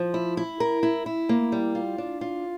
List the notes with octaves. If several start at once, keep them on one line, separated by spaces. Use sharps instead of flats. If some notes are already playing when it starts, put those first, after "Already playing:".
Already playing: F3
E4
E4
A#4
E4
E4
A#3
G3
F4
D4
F4